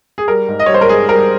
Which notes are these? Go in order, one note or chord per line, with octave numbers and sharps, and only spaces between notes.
G#4
G3 A#4
G#2
D#5
G3 C#5
C5
A#4
G#2 G#4
G3 A#4